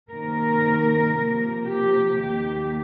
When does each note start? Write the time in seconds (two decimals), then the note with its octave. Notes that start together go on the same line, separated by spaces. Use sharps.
0.11 C3 D#3 A#3 A#4
1.14 C3 F3 A#3
1.65 G4
2.16 D#2 D#3 A#3 G4